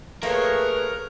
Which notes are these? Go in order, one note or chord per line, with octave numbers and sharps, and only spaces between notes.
F3 A3 A#3 G#4 A#4 B4 C#5